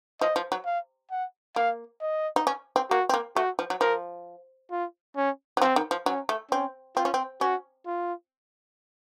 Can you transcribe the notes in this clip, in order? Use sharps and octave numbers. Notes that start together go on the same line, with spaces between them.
F3 D#5
F3
F#3
F5
F#5
A#3 F5
D#5
D#4
C#4
C4
A#3 F#4
C4
A#3
A3 F#4
F3
F#3
F3 A#4
F4
C#4
F#3
F3 C4
D#3
F3
F#3 C#4
A3
C4 C#4
C4 F4
C#4
C4
C#4 F#4
F4